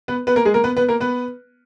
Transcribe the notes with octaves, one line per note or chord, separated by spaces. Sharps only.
B3 B4
B3 B4
A#3 A#4
G#3 G#4
A#3 A#4
B3 B4
B3 B4
A#3 A#4
B3 B4